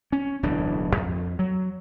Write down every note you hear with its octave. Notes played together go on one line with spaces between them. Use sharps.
C#4
D1 B1 E3 D4
F2
F#3